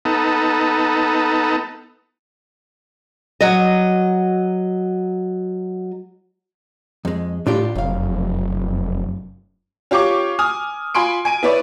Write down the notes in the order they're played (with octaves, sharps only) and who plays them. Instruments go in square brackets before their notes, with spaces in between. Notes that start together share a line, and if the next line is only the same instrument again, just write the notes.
[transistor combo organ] B3 D#4 A4
[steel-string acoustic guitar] F#3 D#5
[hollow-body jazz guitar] F2 G#3
[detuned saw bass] A2 [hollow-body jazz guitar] D4 F4 G4
[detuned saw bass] F1 [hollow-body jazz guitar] F#2 F5
[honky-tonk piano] C#4 F4 G4 C#6 D6
G#5 D#6 F6
F4 G#5 B5 C6 D7
G#5 D7 D#7
B3 E4 B4 C#5 D5